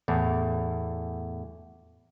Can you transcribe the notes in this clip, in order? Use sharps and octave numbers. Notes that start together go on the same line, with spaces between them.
E2 A2